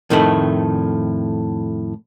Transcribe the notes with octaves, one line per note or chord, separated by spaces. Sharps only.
F2 A2 D#3 A3 B5